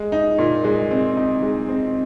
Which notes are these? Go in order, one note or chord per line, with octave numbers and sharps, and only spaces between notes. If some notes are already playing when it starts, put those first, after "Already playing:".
Already playing: G#3
D#4
A#2
G#3
C4
D#4
G#3
C4